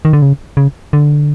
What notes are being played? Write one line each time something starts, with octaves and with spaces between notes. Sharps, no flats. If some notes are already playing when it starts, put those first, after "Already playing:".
D#3
D3
C#3
C#3
D3